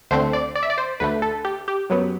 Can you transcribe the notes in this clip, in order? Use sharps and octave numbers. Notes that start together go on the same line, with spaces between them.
D2 D3 A3 C4 C5
D5
D5
E5
D5
C5
D2 D3 A3 B4
A4
G4
G4
F#2 F#3 B3